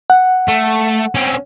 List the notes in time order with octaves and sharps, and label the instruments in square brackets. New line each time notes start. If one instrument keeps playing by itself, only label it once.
[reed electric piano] F#5
[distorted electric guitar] A3
C4 C#4